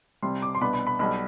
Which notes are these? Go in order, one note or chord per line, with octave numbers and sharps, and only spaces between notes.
C2 C3 G3 C6
D6
C6
C2 B2 B3 D4 B5
B5
B5
B1 B2 G3 B5